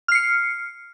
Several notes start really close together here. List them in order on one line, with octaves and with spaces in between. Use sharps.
F6 C7 C#7